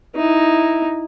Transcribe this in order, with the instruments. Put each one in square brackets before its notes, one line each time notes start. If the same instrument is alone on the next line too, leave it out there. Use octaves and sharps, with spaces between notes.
[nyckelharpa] D#4 E4